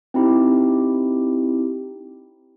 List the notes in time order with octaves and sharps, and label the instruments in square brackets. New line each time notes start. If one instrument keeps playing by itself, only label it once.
[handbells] C4 D#4 E4 G4